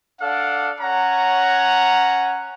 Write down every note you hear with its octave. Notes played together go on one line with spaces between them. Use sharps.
D4 A4 D5 F5 F#5
C#4 C#5 F#5 A#5